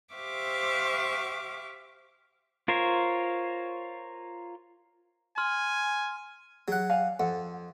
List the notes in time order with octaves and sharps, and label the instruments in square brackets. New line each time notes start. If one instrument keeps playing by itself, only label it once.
[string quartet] G4 C5 E5 F5 C#6 D6
[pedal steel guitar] F4 A#4 C5 C#5
[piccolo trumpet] G#5 [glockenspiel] C6 F6
[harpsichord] F#3 F#5 [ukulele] G#4
[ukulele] D5 F5 G#5
[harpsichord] F2 [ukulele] F#5